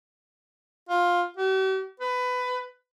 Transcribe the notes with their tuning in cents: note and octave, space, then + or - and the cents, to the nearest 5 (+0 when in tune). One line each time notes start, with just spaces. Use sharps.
F4 +10
G4 -45
B4 +20